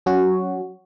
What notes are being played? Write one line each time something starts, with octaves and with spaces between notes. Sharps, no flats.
F#3 C#4 F#4